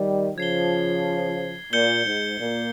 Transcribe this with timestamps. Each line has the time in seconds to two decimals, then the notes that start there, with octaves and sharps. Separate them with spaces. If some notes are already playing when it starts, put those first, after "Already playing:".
Already playing: D#3 G3
0.38 C#3 F3 G#6 C7 G7
1.72 A#2 G6 C#7 G7
2.05 G#2
2.39 A#2